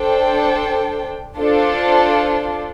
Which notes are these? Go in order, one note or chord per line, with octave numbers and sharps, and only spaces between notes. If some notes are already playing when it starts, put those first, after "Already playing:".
Already playing: D4 A4 C5 G5
D4 F4 A4 C5